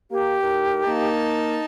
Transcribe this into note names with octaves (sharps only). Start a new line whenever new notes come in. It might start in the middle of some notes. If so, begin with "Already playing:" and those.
A#3 G4
A2 D#4 A#4
A#3 D#4 A5